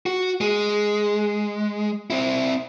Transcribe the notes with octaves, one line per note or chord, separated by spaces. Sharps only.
F#4
G#3
C4 E4